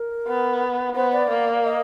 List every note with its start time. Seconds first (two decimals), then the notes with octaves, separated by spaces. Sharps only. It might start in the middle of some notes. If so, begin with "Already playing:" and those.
Already playing: A#4
0.28 B3
0.95 B3 C5
1.13 D5
1.30 A#3
1.64 D#5